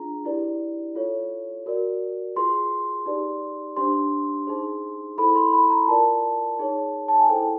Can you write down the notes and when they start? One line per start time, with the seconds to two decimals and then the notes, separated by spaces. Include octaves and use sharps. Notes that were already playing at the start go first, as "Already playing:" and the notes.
Already playing: D4 F4 G#4 A#5
0.25 E4 G4 B4 D5
0.95 F4 A4 C#5
1.66 F#4 A#4 D5
2.36 F4 G#4 B4 C6
3.06 D#4 G4 B4 D5
3.76 D4 G4 C5 C6
4.47 D#4 G#4 C5
5.18 E4 A4 C5 B5
5.35 C6
5.53 B5
5.71 A#5
5.88 F4 A#4 D5 A5
6.59 D#4 G#4 C#5
7.08 A5
7.19 G#5
7.29 E4 A4 C5 G5